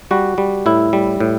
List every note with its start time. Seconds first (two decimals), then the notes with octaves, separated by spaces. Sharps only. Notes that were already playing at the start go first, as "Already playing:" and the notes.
0.11 G3 F#4
0.38 G3
0.66 A2 E4
0.93 G3
1.20 A2